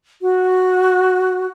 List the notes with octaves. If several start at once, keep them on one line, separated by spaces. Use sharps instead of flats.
F#4